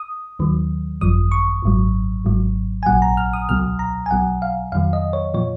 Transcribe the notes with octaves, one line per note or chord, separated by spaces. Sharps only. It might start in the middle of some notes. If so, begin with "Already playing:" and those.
Already playing: D#6
D#2 D#3 F#3
G#1 F#2 F3 D#6
C#6
G#1 G#2 F#3
G#1 G#2 F#3
G#5
A#1 A#2 F#3 F#5
A#5
F6
D#6
C#2 B2 F#3 F6
A#5
G#5
B1 B2 F#3 F#5
F5
F2 D#3 F#3 F5
D#5
C#5
A#2 F3 C#5